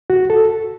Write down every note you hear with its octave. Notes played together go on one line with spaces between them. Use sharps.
F#4
A4